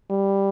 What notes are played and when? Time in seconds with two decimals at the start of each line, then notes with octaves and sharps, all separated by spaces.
0.10 G3